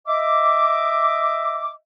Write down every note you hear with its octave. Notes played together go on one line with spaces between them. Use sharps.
D#5 E5 D6